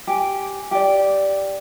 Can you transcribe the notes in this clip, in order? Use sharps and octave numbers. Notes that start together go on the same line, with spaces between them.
G4 G#5
G4 D5